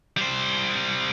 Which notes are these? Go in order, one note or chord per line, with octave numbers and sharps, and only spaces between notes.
G3 C5